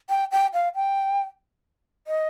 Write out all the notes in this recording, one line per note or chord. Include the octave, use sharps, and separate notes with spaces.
G5
G5
F5
G5
D#5